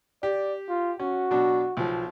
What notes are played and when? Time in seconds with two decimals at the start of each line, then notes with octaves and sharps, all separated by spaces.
0.23 G4 D5
0.69 F4
1.00 C#4 F#4
1.31 B2 F#3 D4
1.77 B1 F3